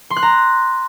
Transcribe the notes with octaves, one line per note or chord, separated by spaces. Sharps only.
C6
F#6
A#5